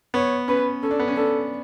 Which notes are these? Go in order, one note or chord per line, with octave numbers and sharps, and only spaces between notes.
B3 C#5
C#4 B4
C#4 A4
D4
B3
C#4
D4 A4